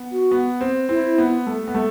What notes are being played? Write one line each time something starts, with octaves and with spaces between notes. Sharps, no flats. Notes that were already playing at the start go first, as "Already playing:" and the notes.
Already playing: B3
F#4
B3
C4
C4 E4
B3
A3
B3
A3